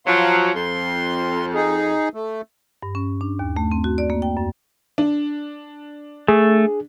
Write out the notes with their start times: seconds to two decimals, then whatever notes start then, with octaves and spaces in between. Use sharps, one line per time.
0.06 F3 F#3 F5 C6
0.55 F2 C6
1.54 D#4 G#4
2.14 A3
2.83 G2
2.95 C#4
3.21 D4
3.39 D#2
3.57 A3
3.72 C4
3.84 F#4
3.98 D5
4.10 A#3
4.22 G5
4.37 F#2
4.98 D4
6.28 A3 G#4